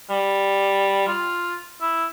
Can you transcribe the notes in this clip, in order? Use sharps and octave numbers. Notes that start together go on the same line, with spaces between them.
G3
F4
E4